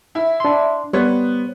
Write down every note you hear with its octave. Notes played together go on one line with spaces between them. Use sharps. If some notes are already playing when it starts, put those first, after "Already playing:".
E4
D4 C6
G3 B3 C5 C#5